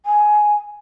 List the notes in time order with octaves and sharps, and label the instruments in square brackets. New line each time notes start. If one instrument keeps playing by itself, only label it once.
[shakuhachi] G#5